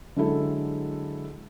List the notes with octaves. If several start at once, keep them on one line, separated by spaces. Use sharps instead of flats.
D3 F#3 G#3 E4 A4